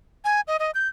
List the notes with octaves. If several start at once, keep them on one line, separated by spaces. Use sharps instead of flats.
G#5
D#5
D#5
G6